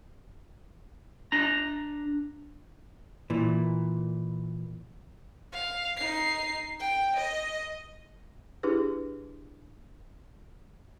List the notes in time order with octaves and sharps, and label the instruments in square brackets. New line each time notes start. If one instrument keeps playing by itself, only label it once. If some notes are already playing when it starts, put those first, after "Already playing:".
[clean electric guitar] D4 A#5
[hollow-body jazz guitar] A#2 E3
[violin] F5
D#4 C7
G5
D#5
[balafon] D4 E4 G4 G#4 B4